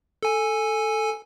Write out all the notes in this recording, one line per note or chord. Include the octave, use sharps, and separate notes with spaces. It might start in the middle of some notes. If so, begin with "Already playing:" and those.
A4 G#5